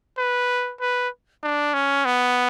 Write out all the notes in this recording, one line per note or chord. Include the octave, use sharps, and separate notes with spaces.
B4
B4
D4
C#4
B3